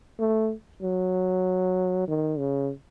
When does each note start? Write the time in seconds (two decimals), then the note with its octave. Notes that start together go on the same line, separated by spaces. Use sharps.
0.19 A3
0.82 F#3
2.08 D#3
2.38 C#3